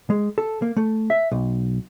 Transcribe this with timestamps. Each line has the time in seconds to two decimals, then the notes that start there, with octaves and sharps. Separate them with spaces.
0.10 G#3
0.38 A4
0.62 A#3
0.77 A3
1.10 E5
1.31 B1